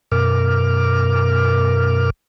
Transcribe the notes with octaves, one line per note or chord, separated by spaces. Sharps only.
F#2 B2 A#4 D6 F6